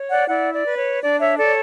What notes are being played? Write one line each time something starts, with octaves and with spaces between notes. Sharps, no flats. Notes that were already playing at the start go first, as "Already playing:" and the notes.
Already playing: C#5
D5 F#5
E4 D5 F#5
D5
B4
C#5
D4 D5
C#5 E5
A4 C#5 D5